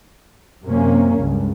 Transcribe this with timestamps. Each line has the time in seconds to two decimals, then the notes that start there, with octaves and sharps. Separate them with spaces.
0.63 F#2 C3 A#3 C#4
1.20 C#2 G2